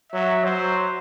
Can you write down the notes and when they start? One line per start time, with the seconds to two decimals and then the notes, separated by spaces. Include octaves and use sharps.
0.12 F#3 E5
0.44 F#3 C5